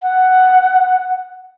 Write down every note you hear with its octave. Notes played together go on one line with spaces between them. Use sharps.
F#5